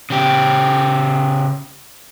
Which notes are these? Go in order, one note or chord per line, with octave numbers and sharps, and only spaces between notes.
C#3 G4